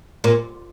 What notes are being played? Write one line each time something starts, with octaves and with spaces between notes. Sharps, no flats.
A#2